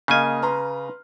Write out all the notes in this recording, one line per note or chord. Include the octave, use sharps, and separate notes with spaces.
C#3 A#3 D#5 G#5 F6
B4 A#5 C6